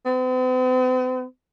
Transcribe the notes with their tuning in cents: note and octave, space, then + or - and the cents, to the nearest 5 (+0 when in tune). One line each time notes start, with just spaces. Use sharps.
C4 -45